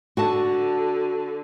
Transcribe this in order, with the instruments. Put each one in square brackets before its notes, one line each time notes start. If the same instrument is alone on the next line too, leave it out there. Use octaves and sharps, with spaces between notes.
[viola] D3 [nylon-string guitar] F#4 F#5 A5